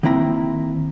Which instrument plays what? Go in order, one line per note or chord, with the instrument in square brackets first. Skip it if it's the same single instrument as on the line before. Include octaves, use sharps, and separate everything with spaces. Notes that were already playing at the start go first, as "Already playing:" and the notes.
[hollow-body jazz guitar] D#3 A#3 C4 E4 A#5